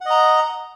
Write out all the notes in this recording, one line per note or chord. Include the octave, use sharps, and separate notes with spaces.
D#5 F#5 A#5